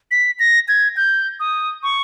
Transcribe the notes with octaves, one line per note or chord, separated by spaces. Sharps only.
B6
A#6
G#6
G6
D#6
C#6